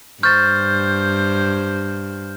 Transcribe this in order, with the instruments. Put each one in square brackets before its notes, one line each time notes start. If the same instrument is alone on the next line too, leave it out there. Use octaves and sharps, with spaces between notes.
[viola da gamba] G2 [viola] C5 [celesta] C#6 A6 [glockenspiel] F6 G6